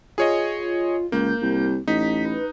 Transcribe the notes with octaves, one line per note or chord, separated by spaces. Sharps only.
F4 G#4 C#5 D#5
C#2 A#3 G6
C2
A1 D#4 B6
B4